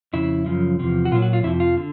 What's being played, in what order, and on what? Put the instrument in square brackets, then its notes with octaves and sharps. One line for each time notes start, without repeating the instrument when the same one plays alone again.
[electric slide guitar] F2 C#3 E4
F#2 C#3 F3
E2 C3 F3
F#4
A#2 F#3 F4
F#4
F4
F2 C3 F3 E4
F4
D3